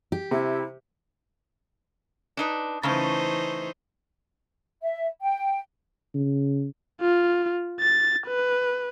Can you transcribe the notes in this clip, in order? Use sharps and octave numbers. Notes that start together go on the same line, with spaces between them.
G4
C3 E4
D4 D#4 B4
C#3 E3 A3 C#4 D#4 C5
E5
G5
C#3
F4
A6
B4